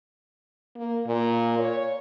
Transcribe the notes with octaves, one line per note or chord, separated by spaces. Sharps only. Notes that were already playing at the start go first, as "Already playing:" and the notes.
A#3
A#2
C#5